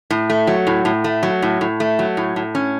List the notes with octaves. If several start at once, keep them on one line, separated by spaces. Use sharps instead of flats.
A2
A3
F#3
A2
A2
A3
F#3
A2
A2
A3
F#3
A2
A2
C#4